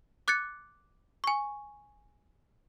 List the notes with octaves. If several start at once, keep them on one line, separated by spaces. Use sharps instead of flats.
D6 F#6 G#6 A6 C#7
G#5 C#6